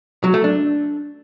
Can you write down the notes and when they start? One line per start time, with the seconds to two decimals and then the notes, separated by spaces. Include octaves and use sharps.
0.24 F#3
0.34 A3
0.44 D4